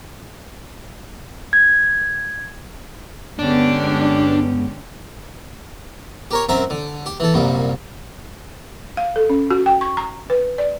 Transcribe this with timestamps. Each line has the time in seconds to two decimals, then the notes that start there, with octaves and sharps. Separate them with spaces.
1.53 G#6
3.39 G2 D3 G#3 B3 C#4 D4 G4
6.31 G4 A#4 C#5
6.49 F#2 C4 A#4 E5
6.70 D3
7.06 G4
7.20 E3 A4
7.34 C2 F#2 A#2 G3
8.97 F5
9.16 A4
9.29 C#4
9.51 F#4
9.66 G5
9.81 C#6
9.97 A#5
10.30 B4
10.58 D5